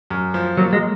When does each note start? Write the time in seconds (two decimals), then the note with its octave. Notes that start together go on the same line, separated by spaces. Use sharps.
0.10 F#2
0.34 F3
0.57 F#3 A#3
0.73 G#3